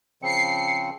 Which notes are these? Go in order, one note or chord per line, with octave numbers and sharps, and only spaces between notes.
C#3 F3 C4 C7 C#7